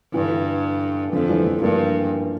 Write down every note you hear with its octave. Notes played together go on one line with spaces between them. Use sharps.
G2 E3
D3
E3
F2 D3 F3
E3 G3
F3 A3
G2 G3 A#3